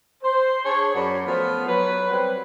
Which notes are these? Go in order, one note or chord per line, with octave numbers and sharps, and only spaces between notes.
C5
D4 G#4 C#5
F#2 F#3 F#4 D5 B5
F3 A3 B3
F#3 B4
F#3 G3 C4 B4